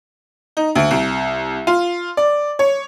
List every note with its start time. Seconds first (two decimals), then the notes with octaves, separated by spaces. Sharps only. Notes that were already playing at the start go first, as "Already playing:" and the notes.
0.57 D#4
0.75 D2
0.91 C2
1.67 F4
2.17 D5
2.59 C#5